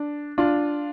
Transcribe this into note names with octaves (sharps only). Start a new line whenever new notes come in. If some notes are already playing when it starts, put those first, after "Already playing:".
Already playing: D4
D4 F4